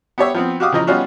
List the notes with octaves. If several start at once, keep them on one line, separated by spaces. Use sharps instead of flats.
B3 G4 C#5 E5
F3 B3 C4
F#4 G4 F5 D6 D#6
C#3 E3 F3 D#5 A#5
G3 B3 C#4 D#4 F4 F#4